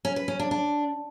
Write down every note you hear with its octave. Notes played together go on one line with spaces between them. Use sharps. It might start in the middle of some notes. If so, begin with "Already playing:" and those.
C#4
B4
C#4
D4
D4